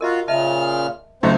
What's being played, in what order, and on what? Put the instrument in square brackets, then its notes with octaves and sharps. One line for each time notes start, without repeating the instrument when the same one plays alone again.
[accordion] F4 F#4 [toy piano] A#4 D#5 A#5
[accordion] A#2 C#3 F6 [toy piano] D#5 E5 A5
[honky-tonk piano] C#2 F#3 A3 [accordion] C4 C5 [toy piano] D#4 D#5